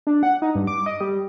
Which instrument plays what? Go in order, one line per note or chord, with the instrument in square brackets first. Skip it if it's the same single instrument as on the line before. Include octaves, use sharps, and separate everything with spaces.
[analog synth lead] D4
F#5
D#4
G2
D6
D#5
G3